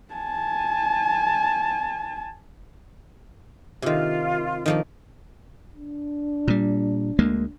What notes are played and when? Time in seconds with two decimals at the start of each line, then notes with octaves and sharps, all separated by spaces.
0.14 G#5 A5
3.82 C3 D#3 F4
4.66 D#3 F3 A#3
5.76 D4
6.48 A#2 G3
7.19 D2 G#3 A#3